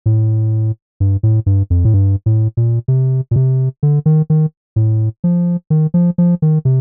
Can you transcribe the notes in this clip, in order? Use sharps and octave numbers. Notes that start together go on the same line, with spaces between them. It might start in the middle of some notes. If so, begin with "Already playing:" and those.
A2
G2
A2
G2
F2
A2
G2
A2
A#2
C3
A#2
C3
D3
D#3
D#3
A2
F3
D#3
F3
F3
D#3
C3